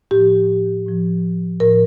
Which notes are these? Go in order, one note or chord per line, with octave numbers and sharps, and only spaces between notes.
A2 F3 G4
A2 F3
A2 F3 A#4